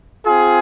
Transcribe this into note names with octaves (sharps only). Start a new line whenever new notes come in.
C4 F4 G#4